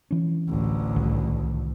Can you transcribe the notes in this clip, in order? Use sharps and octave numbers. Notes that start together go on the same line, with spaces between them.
E3 C#4
A1 D2
C2 D#3